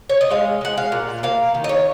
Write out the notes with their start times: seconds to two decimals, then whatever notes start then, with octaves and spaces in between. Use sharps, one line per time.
0.10 C#5
0.21 D#5
0.30 G#3 F5
0.61 G#3 F#5
0.78 F5
0.92 A#2
1.23 A#3 F5
1.55 D#3
1.64 D#5
1.69 C#5